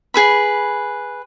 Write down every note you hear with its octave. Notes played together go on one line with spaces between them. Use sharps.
G#4 B4 B5